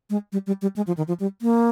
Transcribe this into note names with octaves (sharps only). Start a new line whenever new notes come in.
G#3
G3
G3
G3
G#3
F3
D#3
F3
G3
A#3